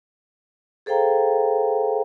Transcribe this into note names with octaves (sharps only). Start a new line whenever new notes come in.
G#4 A4 C5 F5 G5 A#5